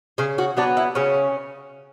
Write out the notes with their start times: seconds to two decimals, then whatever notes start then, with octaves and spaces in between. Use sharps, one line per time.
0.18 C#3 G#4
0.38 F#4
0.57 F#3 B3 D4
0.77 E4
0.95 C#3 C#4